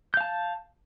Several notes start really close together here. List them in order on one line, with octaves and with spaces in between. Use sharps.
G6 F5 A5